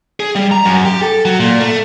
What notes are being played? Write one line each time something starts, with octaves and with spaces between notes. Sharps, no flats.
G#4
G3
A#5
F#2
G4
A4
F#3
A#2
A3